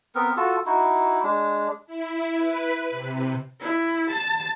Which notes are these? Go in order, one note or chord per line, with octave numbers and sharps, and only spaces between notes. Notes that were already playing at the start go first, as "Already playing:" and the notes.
B3 C4 A#4
F4 F#4 A4
D#4 E4 F#4
G#3 D4
E4
B4
C3
E4
A5